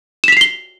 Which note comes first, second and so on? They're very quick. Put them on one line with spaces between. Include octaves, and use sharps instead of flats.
E7 B6 F7 C7 G7